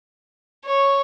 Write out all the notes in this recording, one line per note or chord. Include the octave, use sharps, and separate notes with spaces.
C#5